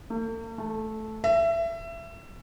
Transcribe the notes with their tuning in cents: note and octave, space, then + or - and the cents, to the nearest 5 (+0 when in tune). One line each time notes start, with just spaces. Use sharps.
A3 +45
A3 -10
E5 +25